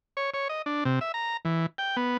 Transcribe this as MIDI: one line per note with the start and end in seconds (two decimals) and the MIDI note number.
0.17 0.30 73
0.34 0.48 73
0.49 0.62 75
0.66 0.84 62
0.85 0.99 48
1.01 1.12 76
1.14 1.37 82
1.45 1.66 52
1.78 1.96 79
1.97 2.17 59